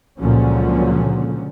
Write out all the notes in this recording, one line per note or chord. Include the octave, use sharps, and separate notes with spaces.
C#2 A#2 D3 F3 F#3 C#4